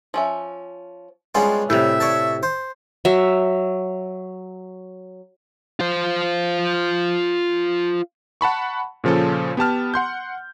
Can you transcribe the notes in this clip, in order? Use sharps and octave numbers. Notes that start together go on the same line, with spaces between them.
F3 C#4 E5
G3 G#3 B3 C#4 D4 F4
A2 C3 G3 E5
C#5 D5 A5
C5
F#3 E5
F4 C5
F#5 A5 B5 C#6
A#2 C#3 F3 C#4 A4
B3 G4 A5 F6
F#5 C6 G6